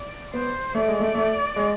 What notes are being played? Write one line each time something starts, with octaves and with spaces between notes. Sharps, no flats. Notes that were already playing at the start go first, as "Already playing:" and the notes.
Already playing: D5
B3 C5
A3 D5
G#3
A3
A3
G#3